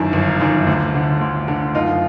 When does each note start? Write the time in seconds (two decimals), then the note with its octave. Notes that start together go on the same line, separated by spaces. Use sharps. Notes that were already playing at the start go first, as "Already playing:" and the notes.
Already playing: G1 F#2 D#3 D4 E4
0.13 G1
0.40 F#2 D#3
0.67 D2
0.94 D3
1.21 D2
1.48 D3
1.75 F#1 D#4 F4